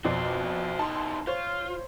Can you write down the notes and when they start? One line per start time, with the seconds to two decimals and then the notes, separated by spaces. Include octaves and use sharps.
0.04 F2 B2 F#4 C5 D5
0.79 E2 D#4 A5 C6
1.27 F4 C5 C#5